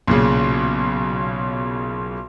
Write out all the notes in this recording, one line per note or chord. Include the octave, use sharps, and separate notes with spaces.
B1 A#2 C#3